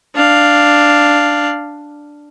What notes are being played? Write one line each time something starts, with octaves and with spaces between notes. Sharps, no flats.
D4 F5